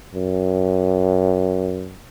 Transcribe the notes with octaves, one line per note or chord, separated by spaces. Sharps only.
F#2